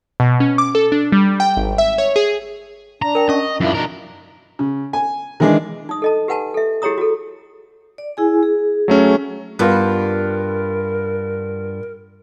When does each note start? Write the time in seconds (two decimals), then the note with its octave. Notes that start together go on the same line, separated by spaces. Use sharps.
0.20 B2
0.40 C#4
0.58 D6
0.75 A4
0.92 D4
1.12 G3
1.40 G5
1.57 G#1
1.78 E5
1.98 C#5
2.16 G#4
3.02 D4 A#5
3.15 A#4 G5
3.29 C#4 D#5 C#6
3.61 F#2 D4 E4 F4
3.75 B2 D4 D#4 A#4
4.59 C#3
4.93 G#5
5.40 D#3 E3 G#3 D4
5.89 D#4 D#6
6.02 A4 D#5 A5
6.28 G4 B4 F#5 G#5 A5
6.54 A4 E5
6.82 E4 G4 G#4 C#5 A#5 D#6
6.98 F#4 A4
7.98 D5
8.17 E4 G#4 G#5
8.43 G#4
8.88 F#3 A3 C#4
9.59 G2 G3 B3 F4 A#4